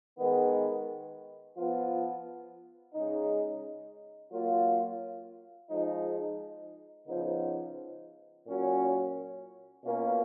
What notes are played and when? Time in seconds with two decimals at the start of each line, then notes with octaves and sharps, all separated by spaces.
0.18 D#3 G#3 B3
1.56 F3 B3 F4
2.94 C#3 G#3 D#4
4.32 F#3 A#3 F4
5.70 F3 G#3 D#4
7.08 C#3 F3 B3 D#4
8.47 A#2 F#3 C#4
9.83 B2 A#3 C#4 F4